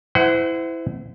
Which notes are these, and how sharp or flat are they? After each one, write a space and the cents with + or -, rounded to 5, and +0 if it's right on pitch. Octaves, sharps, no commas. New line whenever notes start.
E4 +0 C5 -35 F#5 +20